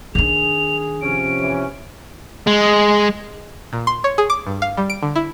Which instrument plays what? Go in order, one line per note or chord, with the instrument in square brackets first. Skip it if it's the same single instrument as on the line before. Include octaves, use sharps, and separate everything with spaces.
[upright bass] D#3 D4 [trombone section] G#4 [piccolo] F7
[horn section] C3 F3 C#4 [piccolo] D7
[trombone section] E3
[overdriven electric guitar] G#3
[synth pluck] A#2
C6
C#5
G#4
D6
G2
F5
G3
D7
D3
E4